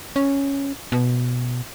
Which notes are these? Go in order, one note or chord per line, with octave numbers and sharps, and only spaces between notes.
C#4
B2